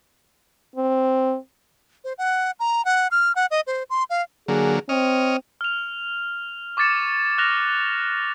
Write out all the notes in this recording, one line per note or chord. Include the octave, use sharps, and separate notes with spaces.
C4
C5
F#5
A#5
F#5
F6
F#5
D#5
C5
C6
F5
D3 F#3 A#3 G#4
C4 C#5 D#5 F6
F6 F7
C#6 D6 G#6 A6 C#7 E7
F6 F#6 A#6 F7